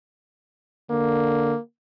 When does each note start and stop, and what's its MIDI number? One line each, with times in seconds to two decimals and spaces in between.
0.90 1.54 50
0.90 1.58 58